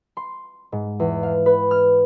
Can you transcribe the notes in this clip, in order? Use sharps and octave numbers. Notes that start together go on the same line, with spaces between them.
C6
G#2
E2
F5
B4
F6